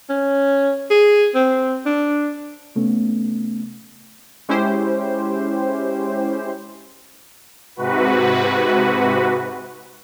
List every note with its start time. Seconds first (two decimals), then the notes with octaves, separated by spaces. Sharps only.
0.10 C#4
0.91 G#4
1.35 C4
1.86 D4
2.76 C3 A3 B3 C#4
4.49 G#3 C#4 E4 G4 C5
7.76 G#2 C3 F#4 B4